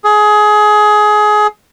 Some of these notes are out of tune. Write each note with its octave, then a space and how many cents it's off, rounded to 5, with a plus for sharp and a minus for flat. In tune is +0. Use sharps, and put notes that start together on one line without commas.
G#4 +20